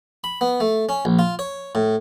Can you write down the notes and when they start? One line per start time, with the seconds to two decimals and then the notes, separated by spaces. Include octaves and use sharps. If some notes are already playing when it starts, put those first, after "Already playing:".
0.24 B5
0.41 B3
0.60 A3
0.89 C#4
1.05 A#1
1.19 F4
1.39 C#5
1.75 A2